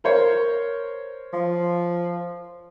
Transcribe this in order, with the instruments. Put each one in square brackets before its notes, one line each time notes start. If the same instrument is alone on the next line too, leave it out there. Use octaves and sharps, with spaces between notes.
[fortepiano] A#4 C5 C#5
[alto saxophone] F3